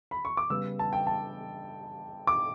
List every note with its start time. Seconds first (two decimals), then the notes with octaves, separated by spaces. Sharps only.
0.11 B5
0.25 C#6
0.37 D6
0.50 C#3 G3 B3 E6
0.79 A5
0.93 G5
1.07 A5
2.27 D6